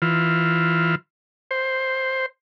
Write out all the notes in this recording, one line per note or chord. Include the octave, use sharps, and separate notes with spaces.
E3 F4
C5